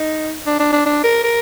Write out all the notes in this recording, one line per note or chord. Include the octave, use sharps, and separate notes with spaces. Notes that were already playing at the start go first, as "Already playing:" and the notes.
Already playing: D#4
D4
D4
D4
D4
A#4
A#4